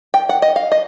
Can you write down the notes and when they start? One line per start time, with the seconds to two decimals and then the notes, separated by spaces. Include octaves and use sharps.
0.14 G5
0.29 F#5
0.42 D#5
0.56 F5
0.72 D#5